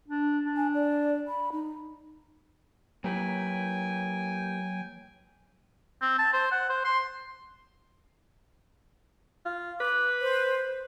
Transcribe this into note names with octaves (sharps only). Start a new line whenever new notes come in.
D4
D4
G#5
D5
B5
D#4
F#3 A#3 G4 B4 G5 G#5
C4
A5
C5
F#5
C5
C6
F4
B4 D6
C5